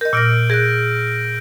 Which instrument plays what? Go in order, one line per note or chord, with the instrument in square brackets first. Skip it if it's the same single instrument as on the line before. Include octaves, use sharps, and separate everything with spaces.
[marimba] A#4 D#5 [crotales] G6
[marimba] A#2 A#6 [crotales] E6 F6 D7
[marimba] G#4 F#6 [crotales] G6 A#6 D7